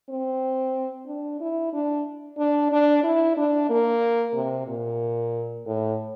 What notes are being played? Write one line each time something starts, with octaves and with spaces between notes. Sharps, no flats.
C4
D4
E4
D4
D4
D4
E4
D4
A#3
C3
A#2
A2